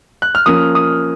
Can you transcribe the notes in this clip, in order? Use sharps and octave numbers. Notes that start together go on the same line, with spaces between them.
F#6
F6
F3 A#3 C#4 D#6
D#6